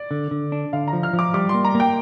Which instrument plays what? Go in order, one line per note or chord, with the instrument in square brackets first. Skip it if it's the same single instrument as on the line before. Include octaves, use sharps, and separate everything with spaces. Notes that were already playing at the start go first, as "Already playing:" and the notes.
Already playing: [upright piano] D5
[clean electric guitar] D3
D3
D4
[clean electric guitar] D3 [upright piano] F5
[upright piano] A#5
[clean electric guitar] F3
[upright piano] F6
[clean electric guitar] F3
[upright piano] D6
[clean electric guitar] G3 [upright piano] D6
[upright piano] C6
[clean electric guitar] A#3
[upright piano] A#5
[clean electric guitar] A#3
[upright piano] G5